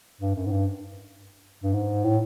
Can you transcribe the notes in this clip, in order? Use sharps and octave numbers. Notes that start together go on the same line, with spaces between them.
G2
F#2
G#2
G2
G2
G#2
A2